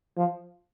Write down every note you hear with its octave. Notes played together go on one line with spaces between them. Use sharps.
F3